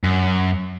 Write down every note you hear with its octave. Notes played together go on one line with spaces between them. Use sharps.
F#2